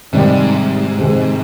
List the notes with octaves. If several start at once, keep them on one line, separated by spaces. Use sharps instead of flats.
G#2 C3 D#3 G3
C3 D#3 G#3 C4